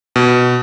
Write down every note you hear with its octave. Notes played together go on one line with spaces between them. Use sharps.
B2